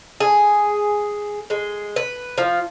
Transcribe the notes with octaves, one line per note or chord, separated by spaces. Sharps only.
G#4
G#3
B4
F3